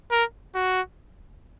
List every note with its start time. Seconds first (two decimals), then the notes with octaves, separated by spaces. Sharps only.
0.11 A#4
0.55 F#4